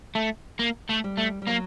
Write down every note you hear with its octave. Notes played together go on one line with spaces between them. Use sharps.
A3
A#3
A3
G3
A3
G3
F#3 A#3